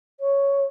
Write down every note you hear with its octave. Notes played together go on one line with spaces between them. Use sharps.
C#5